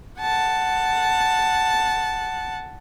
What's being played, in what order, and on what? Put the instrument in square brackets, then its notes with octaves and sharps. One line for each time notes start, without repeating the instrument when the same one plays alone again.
[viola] F#5 A5